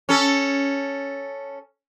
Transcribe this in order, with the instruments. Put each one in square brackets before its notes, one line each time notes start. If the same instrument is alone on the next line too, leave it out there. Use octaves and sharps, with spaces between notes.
[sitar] C#4 A4